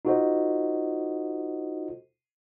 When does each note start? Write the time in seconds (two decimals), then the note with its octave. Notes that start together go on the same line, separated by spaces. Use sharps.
0.05 D#4 F4 F#4 A4 C5 D#5